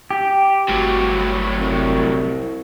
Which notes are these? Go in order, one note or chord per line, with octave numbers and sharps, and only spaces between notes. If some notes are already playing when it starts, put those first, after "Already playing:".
G4
G1 A2 F#3 G3
C2